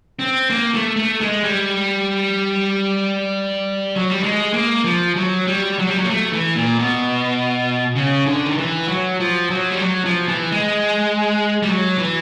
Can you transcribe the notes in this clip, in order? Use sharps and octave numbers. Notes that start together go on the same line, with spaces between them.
C4
A#3
A3
A3
G#3
G3
F#3
G3
G#3
A#3
F3
F#3
G3
F#3
G3
F#3
A#3
A3
E3
A#2
B2
C#3
D3
D#3
E3
F#3
F3
F#3
G3
F#3
F3
E3
G#3
G3
F#3
E3